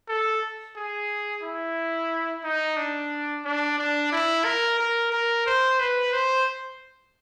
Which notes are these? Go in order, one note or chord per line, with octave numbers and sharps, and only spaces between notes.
A4
G#4
E4
D#4
D4
D4
D4
E4
A#4
A#4
A#4
C5
B4
C5